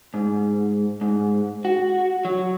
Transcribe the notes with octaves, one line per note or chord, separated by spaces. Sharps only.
G#2
G#2
F#4
F#3